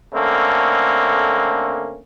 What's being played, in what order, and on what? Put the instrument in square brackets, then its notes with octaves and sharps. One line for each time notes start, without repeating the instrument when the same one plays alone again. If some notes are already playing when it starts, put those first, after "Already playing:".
[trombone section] D3 A3 A#3 C4 C#4